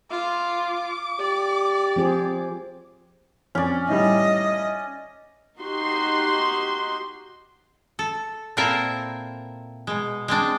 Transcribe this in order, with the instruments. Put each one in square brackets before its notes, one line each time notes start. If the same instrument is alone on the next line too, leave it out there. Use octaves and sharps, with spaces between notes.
[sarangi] F4 [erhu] D6
[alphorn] G4 [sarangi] D5
[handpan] F3 C4 G#4
[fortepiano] F2 [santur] C#4 D5
[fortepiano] A2 D#3 G3 [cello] D#5
[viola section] D#4 F#4 G4 C6
[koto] A4
A#2 C4 E4 A4 A#4 E5
B2 G#3
G#3 C4 D4